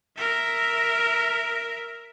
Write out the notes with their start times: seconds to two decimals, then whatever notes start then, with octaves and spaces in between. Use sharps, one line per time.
0.17 A#4 E5